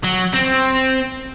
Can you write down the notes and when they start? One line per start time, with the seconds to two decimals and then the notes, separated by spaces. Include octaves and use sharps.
0.05 F#3
0.34 C4